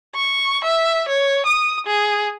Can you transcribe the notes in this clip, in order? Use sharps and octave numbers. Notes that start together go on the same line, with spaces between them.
C#6
E5
C#5
D#6
G#4